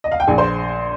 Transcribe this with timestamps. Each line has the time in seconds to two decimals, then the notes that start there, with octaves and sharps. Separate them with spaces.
0.04 D#5
0.12 F5
0.20 G5
0.27 A#1 G#4 G#5
0.38 C5 C6